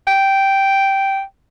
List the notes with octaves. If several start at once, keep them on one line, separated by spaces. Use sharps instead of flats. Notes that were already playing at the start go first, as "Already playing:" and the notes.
G5